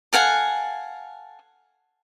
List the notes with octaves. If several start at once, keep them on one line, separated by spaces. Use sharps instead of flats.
A4 F5 F#5 G#5